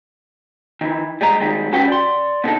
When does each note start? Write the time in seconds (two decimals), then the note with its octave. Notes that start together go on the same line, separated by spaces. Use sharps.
0.81 D#3 E3
1.21 G3 G#3 D#5 A#5
1.40 D#3 G3 G#3
1.73 C#4 F#4 G4 B4 F#5 G5
1.88 D5 C6
2.44 B2 D3 D#4 A4